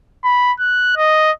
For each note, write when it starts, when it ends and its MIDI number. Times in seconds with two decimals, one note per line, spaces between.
0.24 0.52 83
0.60 0.93 90
0.96 1.32 75